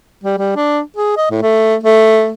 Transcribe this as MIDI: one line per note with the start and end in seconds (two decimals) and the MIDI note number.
0.24 0.38 55
0.38 0.53 55
0.56 0.81 62
0.96 1.12 68
1.17 1.26 75
1.31 1.39 45
1.42 1.76 57
1.83 2.32 57